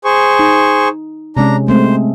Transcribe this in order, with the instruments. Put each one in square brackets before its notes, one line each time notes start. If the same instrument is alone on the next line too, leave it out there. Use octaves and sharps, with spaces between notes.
[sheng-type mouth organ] G#4 C5 C#6
[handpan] D#4
[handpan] C3 G#3 C#4 [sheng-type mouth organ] D4 A#5
[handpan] G#3 A3 C4 [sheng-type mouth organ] C5